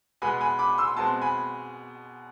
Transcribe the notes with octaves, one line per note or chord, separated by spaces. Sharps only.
B2 G#3 B3 G#5 B5
G#5 B5
B5 D6
C6 E6
B2 G#3 C4 A5 C6
G#5 B5